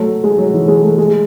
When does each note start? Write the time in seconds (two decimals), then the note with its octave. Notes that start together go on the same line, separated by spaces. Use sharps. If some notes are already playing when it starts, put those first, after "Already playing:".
Already playing: F#3 A3
0.24 G#3
0.38 F#3
0.54 E3
0.68 G#3
0.83 A3
0.98 G#3